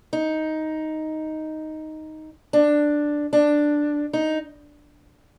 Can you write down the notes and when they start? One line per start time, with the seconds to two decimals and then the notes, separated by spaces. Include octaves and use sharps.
0.13 D#4
2.53 D4
3.33 D4
4.13 D#4